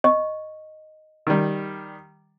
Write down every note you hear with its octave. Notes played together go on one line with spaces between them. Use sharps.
D#5 C#6
D#3 G3